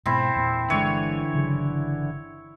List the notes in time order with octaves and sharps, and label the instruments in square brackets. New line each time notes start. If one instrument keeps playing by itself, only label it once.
[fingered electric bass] G#2 B2 [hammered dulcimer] C4 E4
[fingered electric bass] E2 A#2
[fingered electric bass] G1 G#3 [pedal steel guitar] D3 E3 [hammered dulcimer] C#5
[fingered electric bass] G1 C#3 F#3